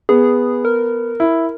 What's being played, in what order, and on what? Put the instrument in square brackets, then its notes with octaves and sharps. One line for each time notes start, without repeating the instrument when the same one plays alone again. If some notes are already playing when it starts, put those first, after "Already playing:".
[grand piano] B3 [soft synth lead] G#4
[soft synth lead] A#4
[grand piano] E4